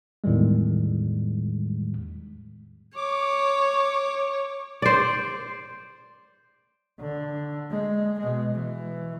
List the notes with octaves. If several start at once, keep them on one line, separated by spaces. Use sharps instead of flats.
E2 A2 D#3 G3 G#3
C#5 D6
C5 D5
D3
G#3
B2 G#3
E3